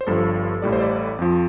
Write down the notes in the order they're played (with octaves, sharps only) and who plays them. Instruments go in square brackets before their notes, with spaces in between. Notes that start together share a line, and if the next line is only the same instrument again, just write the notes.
[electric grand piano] C5
G1 G2 F3 A4
A1 A2 G3 D5
C5
D5
F2 F3